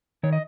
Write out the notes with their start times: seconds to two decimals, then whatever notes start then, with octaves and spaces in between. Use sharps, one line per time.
0.23 D#3 C#5
0.33 D#5